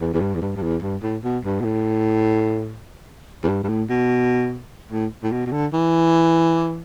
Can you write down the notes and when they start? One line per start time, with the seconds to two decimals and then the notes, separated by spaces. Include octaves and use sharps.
0.01 E2
0.14 E2
0.21 G2
0.35 E2
0.42 G2
0.56 G2
0.62 E2
0.82 G2
1.03 A2
1.24 B2
1.45 G2
1.60 B2
1.64 A2
3.44 E2
3.48 G2
3.64 G2
3.69 A2
3.90 B2
4.92 A2
5.23 A2
5.32 B2
5.47 B2
5.52 D3
5.73 E3